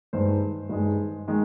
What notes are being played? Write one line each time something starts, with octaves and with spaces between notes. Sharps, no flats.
G2 D#3 G#3 C5
G2 D#3 G#3
D#3 G#3